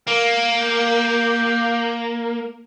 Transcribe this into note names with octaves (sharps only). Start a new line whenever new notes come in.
A#3 A#4
G4